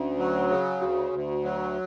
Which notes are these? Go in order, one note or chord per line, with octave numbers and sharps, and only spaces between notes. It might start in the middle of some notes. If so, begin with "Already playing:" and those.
Already playing: D2 C#4
F#3
C#3
D2 F#4
D2
F#3